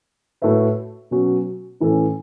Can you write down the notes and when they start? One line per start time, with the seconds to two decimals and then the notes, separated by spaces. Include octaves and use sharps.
0.42 A2 A3 F#4 B4 E5
1.11 B2 F#3 C#4 F#4
1.80 A2 E3 A3 C#4 A4